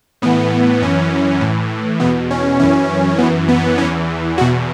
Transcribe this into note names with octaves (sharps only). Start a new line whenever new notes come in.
A2 E3 B3
F#2 E3 C#4
A2 E3
E2 B2 B3
C#4
F#2 E3 C#4
F#2 E3 B3
B3
E2 E3 C#4
E2 B2 F#4